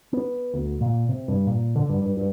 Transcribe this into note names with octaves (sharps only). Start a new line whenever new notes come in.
B3
D2
A#2
C3
G2
A#2
D3
G2
G2
G2